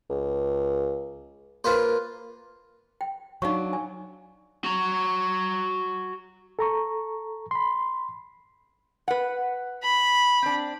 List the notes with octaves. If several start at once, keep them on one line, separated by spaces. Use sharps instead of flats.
C#2
A#3 F4 B4 C5
G5
F#3 D4 D#4 F5 C#6
G#5
F#4 A#5
A4 A#5 C#6
B5 C6
B4 F#5
B5
C4 D4